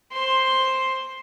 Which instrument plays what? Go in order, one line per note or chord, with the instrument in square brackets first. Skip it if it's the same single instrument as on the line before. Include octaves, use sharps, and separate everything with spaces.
[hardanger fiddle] C5 C6